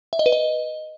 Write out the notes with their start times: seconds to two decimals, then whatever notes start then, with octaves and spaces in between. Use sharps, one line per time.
0.13 E5
0.19 D#5
0.26 B4
0.32 D#5